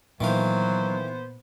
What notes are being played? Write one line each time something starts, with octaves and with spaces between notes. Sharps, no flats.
A#2 D#3 E3 F#3 B3 C5 F5